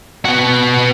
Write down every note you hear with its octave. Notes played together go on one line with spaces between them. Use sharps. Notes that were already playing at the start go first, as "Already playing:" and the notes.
B3 F#4